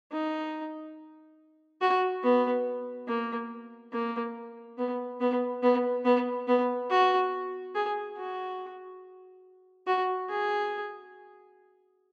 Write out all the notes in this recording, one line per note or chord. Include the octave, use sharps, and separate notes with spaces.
D#4
F#4
B3
A#3
A#3
B3
B3
B3
B3
B3
F#4
G#4
F#4
F#4
G#4